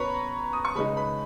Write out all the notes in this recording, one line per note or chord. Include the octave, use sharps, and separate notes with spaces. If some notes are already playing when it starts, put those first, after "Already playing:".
Already playing: B2 C#4 B4 C#5 A#5 B5 C#6
D#6
C#6
C#3 G#3 D#4 B4 B5
B4 B5